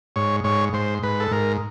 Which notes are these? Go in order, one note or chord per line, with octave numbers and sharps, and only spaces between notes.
G#2 C#5
G#2 C#5
G#2 C5
G#2 B4
A4
G#2 A#4